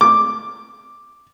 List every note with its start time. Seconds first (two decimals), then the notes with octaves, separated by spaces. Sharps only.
0.01 D6